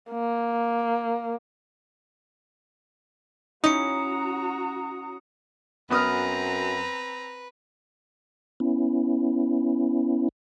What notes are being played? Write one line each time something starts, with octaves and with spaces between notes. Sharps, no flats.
A#3
C#4 D#4 E4 F#4 A#5 D#6 C#7
F#2 B3 C4 B4 A#5 D#6 F6
B3 C#4 E4